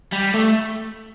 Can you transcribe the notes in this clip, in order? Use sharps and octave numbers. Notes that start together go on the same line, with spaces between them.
G3
A3